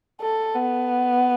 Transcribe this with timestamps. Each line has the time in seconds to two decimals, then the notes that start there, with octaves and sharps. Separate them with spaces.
0.21 A4
0.55 B3